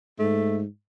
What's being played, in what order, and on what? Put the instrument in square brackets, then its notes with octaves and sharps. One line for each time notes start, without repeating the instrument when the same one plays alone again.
[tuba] G#2 [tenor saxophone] A3